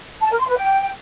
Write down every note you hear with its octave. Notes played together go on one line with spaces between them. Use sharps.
A5
A#4
C6
B4
G5